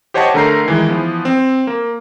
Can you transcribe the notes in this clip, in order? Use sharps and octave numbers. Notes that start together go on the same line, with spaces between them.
G4 C5 C#5 D#5 F#5 A5
D3 A3 A#4 A#5 G6 C7
D#3 E3 G#3
E3 F3 B3
C4
A#3